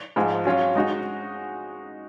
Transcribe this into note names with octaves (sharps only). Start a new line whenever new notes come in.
G#2 F3 G#3
F#3 C#4 F4
G#3 D#4 F#4